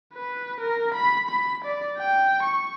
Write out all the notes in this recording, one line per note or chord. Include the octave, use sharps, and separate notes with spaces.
B4
A#4
B5
B5
D5
G5
C#6